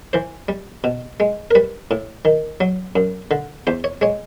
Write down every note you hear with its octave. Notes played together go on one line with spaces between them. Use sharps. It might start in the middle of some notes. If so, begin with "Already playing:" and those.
E3 C5
G3
B2
G#3
A#4
G3 B4
A2
D#3
F#3
F#2
D3
E2 C5
C#5
G#3 C#5